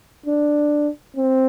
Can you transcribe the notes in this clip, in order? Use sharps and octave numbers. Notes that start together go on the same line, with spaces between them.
D4
C4